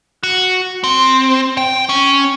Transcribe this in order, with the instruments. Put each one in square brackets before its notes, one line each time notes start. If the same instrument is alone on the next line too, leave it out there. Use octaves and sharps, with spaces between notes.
[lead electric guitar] F#4
C4
G5
C#4